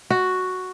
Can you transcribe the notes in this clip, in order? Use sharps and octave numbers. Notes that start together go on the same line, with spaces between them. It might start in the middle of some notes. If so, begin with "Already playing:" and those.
F#4